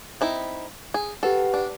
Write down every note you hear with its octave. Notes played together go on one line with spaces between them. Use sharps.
C4 D#4 E4
G#4
G4 A4 B4 F#5
D4